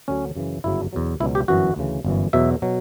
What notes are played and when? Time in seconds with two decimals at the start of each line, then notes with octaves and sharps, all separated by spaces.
0.08 D2 D3 F#3 C#4
0.36 F#2 C#3 E3
0.64 G1 F#2 C#3 F#3 E4
0.93 E2 B2 F#3
1.20 C#2 B2 F#3 E4
1.35 G4
1.48 G1 F#2 E3 F#4
1.76 D2 C#3 E3
2.05 G1 F#2 E3
2.33 E2 B2 F#3 E5
2.62 B2 F#3